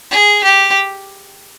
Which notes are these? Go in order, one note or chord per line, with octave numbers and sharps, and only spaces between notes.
G#4
G4